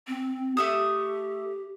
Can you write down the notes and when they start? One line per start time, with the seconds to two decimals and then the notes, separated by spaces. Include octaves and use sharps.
0.08 C4
0.57 A3 G4 E5 D#6